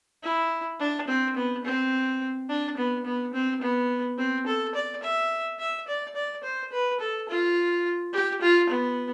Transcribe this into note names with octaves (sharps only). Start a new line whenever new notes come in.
E4
D4
C4
B3
C4
D4
B3
B3
C4
B3
C4
A4
D5
E5
E5
D5
D5
C5
B4
A4
F4
G4
F4
B3